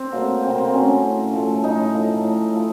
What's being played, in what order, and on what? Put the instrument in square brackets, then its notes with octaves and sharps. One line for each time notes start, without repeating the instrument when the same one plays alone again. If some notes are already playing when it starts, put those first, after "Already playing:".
Already playing: [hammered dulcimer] C4
F#3 A3 A#3
C3 C4
A#3
C4
F#3 A3 C#4
A2
F3 A3
A2 D#4
F3 A3
A2
F3 A3